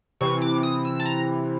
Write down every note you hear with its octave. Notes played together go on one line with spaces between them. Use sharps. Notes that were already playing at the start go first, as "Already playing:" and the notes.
C3 E3 C#6
D6
D#6
E6
A5
A#5